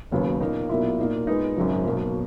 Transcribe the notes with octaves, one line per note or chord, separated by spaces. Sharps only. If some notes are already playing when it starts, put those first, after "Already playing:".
E1 D#2 C#3 F#3 B3
A#2 A#3 D#4
B1 A#2 A#3 E4
A#2 A#3 D#4
A#2 G#3 B3 D#4
G#1 F#2 C#3 F#3
B1 B2 F#3 A#3